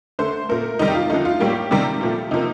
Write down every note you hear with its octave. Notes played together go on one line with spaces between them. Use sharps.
D3 A3 C5
A#2 A3 A#4
C3 D#3 G3 D#4
G4
F4
D3 F3 A3 D#4
F4
A2 G3 A#3 G4
C3 D#3 G3 A#3
A#2 F3 A3
C3 F3 A#3 D#4